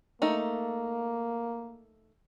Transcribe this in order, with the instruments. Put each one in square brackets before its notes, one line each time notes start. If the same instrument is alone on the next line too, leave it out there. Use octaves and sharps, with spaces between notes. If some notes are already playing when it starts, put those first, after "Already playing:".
[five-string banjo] A3 D#4 [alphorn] A#3